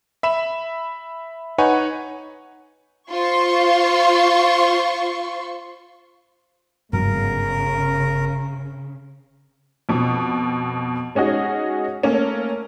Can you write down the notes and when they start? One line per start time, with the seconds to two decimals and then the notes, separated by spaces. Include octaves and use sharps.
0.23 E5 B5 E7
1.58 D#4 B4 C#5 F#5 G#5
3.10 F4 C5 C6 C#6
6.93 G1 G#2 C#3 F#3 A#4
9.89 F2 B2
11.15 G#3 C#4 D#4 F#4 G#4
12.03 A3 A#3 C#4